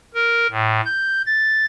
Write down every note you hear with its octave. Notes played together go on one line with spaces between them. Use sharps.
A#4
A2
G6
A6